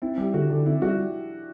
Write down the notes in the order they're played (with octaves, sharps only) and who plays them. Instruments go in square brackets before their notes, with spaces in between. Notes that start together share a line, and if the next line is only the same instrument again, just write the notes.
[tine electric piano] C4 [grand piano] E4
[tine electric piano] G3 [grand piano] G4
[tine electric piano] D3 [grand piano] F#4
[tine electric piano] D3 [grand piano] D4
[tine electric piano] C4 [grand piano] E4
[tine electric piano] G3 [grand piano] F#4